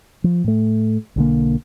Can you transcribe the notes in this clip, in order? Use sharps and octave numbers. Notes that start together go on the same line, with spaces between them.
F3
A2 A3
B1 D3 A#3